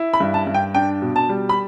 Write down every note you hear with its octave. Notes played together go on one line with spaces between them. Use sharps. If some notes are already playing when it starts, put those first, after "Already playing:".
Already playing: E4
B5
G2
A5
G2
G5
D4 G5
B2
A5
G3
B5